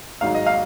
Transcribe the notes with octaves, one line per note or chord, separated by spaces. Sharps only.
G#1 G#2 F#3 F5
D#5
F5